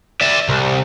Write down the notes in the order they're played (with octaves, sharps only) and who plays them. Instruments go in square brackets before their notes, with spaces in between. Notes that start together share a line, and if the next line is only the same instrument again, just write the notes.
[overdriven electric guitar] D5 E5
C2